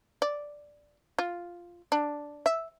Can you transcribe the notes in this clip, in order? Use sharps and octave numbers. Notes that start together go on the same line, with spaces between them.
D5
F4
D4
E5